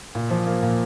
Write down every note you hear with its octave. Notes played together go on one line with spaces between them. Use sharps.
A#2
F3
A#3
A#2